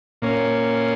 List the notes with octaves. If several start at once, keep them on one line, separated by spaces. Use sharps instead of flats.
A#2 A#3 C#4